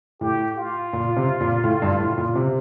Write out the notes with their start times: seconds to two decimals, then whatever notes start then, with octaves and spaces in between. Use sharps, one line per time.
0.21 A2 G4
0.57 F4
0.93 A#2
1.17 C3
1.41 A#2
1.64 A2
1.82 G2
2.00 A2
2.18 A#2
2.36 C3